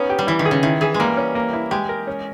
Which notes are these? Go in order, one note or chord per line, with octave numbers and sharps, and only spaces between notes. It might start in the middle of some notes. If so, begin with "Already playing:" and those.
Already playing: B3 C#4 D#4
G4
G3
E3 E4
D#3
G#4
C#3
D#3 E4
E3 G#4
G#3
G3 A#3
C#4
A#3
E4
G#3 G4
A#4
C#4